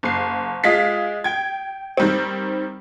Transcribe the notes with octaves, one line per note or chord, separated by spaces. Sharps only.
F#1 C7
G#3 F4 B6 C7
G5 G#6
D#3 G3 C4